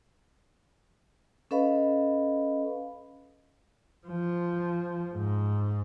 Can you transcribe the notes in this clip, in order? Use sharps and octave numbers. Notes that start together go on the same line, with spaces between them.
C#4 A4 B4 D#5 F5 B5
F3
G#2